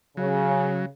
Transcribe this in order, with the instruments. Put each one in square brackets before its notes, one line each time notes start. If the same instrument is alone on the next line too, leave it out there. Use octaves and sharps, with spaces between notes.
[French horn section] C#3 [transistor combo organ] F#3